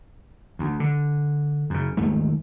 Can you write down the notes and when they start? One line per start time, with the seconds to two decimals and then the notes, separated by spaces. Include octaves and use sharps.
0.59 D2
0.80 D3
1.70 F#2 C#3
1.97 D#2 G#2 D#3 A3